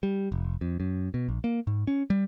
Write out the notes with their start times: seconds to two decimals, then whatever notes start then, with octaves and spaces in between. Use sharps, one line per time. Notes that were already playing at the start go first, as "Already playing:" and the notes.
0.03 G3
0.32 F1
0.61 F2
0.80 F#2
1.14 B2
1.29 A#1
1.44 A#3
1.67 G#2
1.87 C#4
2.10 G3